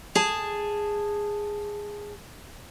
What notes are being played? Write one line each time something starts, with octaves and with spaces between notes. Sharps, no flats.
G#4 A5